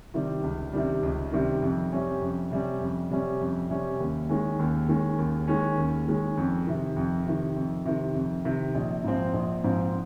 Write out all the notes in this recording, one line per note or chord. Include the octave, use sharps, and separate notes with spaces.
C3 D#3 G3
C#2
C3 D#3 G3
C#2
C3 D#3 G3
F2
C3 G3 C#4
F2
C3 G3 C#4
F2
C3 G3 C#4
F2
C3 G3 C#4
D#2
D#3 G#3 C#4
D#2
D#3 G#3 C#4
D#2
D#3 G#3 C#4
D#2
D#3 G#3 C#4
F2
C3 D#3
F2
C3 D#3
F2
C3 D#3
F2
C3 D#3
A#1
G#2 F3 C4
A#1
G#2 F3 C4